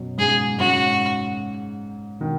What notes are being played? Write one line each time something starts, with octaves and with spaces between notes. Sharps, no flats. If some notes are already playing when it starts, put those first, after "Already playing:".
Already playing: F#2 B2
G#2 C#3 G#4
G#2 C#3 F#4
B2 D#3